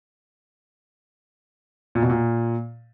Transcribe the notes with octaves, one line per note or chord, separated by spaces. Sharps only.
A#2
B2
A#2